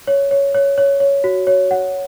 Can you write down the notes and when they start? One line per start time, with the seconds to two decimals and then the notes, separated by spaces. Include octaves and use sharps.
0.07 C#5
0.31 C#5
0.54 C#5
0.78 C#5
1.00 C#5
1.24 F#4
1.47 C#5
1.71 F#5